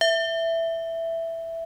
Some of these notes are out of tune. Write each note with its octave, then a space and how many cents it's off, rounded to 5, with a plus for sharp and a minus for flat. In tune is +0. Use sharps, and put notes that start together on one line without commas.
E5 +5